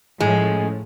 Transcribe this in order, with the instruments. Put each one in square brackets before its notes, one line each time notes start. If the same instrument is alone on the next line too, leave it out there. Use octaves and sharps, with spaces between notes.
[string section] A2 F3 C#4 [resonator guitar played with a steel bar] G#3